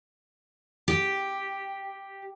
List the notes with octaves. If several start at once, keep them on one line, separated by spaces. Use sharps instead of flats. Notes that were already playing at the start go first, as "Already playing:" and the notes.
G4